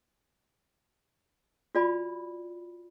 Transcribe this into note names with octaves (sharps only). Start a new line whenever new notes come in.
F4 F#4 D5 G#5 B5